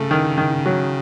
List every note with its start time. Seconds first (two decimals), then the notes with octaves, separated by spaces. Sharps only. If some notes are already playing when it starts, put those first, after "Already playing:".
Already playing: C#3 A3
0.11 D#3
0.38 D#3
0.66 F#3